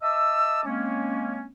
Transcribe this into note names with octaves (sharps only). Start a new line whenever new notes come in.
D#5 E5 A5 D6 E6
G#3 A#3 C4 C#4